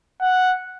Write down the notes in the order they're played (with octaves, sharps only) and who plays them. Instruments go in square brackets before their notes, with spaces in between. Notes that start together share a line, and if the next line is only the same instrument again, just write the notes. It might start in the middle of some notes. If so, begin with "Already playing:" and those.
[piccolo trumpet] F#5